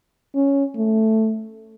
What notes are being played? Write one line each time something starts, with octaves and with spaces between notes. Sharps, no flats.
C#4
A3